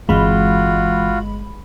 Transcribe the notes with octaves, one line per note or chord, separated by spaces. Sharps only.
G1 E3 G#3 C4 F4 F#4 B5